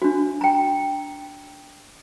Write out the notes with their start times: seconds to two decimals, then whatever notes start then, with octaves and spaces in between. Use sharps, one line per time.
0.02 D4 F#4
0.41 G5 A#5